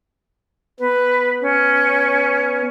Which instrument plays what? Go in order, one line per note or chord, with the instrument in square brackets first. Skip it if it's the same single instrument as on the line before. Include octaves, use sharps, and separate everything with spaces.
[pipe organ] B3 [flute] B4
[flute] C#4